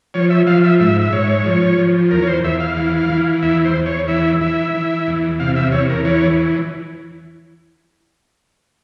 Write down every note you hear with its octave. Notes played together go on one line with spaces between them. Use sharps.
F3 C#5
E5
F3 F5
E5
G#2 E5
E5
G#2 C#5
F3
F3
E2 A#4
C#5
C5
E2 E5
F5
E3
E3
E2 E5
C5
E2
C#5
E3 E5
E3 E5
E3
E2
C3 F5
E5
E2 C#5
A#4
E3 C#5